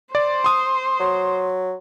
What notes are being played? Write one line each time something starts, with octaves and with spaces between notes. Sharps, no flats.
C5 D5
C6 D#6
F#3